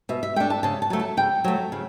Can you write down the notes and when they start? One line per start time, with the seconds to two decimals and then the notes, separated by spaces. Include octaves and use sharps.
0.09 B2 E5
0.23 E5
0.36 A3 D4 G5
0.50 A5
0.63 C#3 A5
0.82 A5
0.90 F#3 A3
0.99 A5
1.17 C#3 G5
1.44 F#3 A3
1.72 C#3